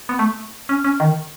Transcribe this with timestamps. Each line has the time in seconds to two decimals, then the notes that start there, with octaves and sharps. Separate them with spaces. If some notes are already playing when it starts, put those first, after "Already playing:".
0.09 B3
0.19 A3
0.69 C#4
0.84 C#4
1.00 D#3